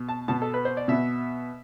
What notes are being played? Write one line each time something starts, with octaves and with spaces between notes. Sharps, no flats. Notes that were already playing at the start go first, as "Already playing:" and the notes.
Already playing: B2
A5
B2 B3 A5
A4
B4
C5
D5
B2 B3 E5